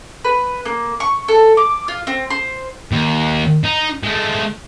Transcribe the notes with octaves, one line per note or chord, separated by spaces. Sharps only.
B4
A#3
C#6
A4
D6
F4
C4
C5
D#2
D#4
G#3 A3